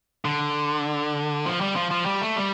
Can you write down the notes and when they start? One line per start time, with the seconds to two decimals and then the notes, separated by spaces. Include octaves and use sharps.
0.25 D3
1.45 F3
1.61 G3
1.76 F3
1.91 F3
2.06 G3
2.22 A3
2.36 G3